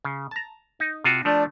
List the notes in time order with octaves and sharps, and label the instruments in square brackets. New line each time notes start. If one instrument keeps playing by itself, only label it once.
[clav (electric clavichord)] C#3
A5 A#5
D#4
C3 F4 F#4
[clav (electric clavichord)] F3 A3 [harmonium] D4